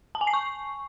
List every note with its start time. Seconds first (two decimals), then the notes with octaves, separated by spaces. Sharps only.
0.15 A5
0.21 G#5
0.27 C7
0.34 C#6